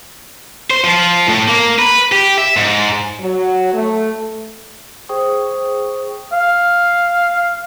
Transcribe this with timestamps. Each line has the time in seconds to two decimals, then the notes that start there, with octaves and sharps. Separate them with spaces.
0.71 C5
0.85 F3
1.29 A2
1.49 A#3
1.79 B4
2.12 G4
2.38 E5
2.57 G#2
3.21 F#3
3.73 A3
5.09 G#4 C5 G5 C#6 D#6
6.32 F5